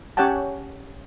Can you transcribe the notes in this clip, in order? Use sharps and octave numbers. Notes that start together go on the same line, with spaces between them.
C#4 G4 C#5 F#5 G5 A5